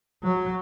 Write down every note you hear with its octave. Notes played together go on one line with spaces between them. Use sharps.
F#3